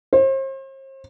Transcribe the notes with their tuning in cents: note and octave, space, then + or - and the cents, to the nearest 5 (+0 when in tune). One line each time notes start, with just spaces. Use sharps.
C5 +40